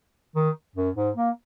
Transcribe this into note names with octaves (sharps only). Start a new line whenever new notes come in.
D#3
F#2
G#2
A#3